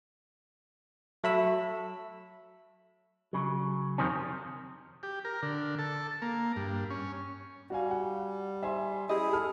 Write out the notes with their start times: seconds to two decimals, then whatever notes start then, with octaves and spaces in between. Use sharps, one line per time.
1.24 F#3 A3 B5 E6
3.33 C#3 F#3
3.98 F2 C3 D#3 C4 C#4
5.03 G4
5.25 A#4
5.42 D3
5.79 A4
6.22 A#3
6.56 G2
6.90 C#4
7.70 G3 F#4 F5 G#5
7.91 F#5
8.63 C5 E5 G#5 C6
9.09 C#4 E4 G4 G#4 D#5
9.33 A4 F6